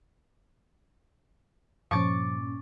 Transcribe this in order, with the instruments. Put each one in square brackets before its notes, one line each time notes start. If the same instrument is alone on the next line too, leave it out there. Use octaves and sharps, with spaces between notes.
[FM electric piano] G2 A#2 C#4 [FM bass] F3 [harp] C#6 D6 A6